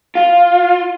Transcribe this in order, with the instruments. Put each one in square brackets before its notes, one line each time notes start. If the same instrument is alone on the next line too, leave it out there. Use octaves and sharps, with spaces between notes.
[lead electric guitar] F4